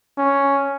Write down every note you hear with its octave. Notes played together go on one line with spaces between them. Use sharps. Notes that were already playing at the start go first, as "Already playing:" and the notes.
C#4